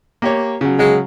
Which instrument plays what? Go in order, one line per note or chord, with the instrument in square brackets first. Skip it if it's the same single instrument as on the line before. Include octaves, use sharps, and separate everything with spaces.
[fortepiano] A#3 G4 C#5
C#3 F#3
[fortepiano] C#3 F#3 [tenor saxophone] G#3